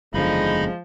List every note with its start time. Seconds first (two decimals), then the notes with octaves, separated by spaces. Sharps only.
0.14 F#1 E2 D3 F3 G#3 D#4 D#5 B5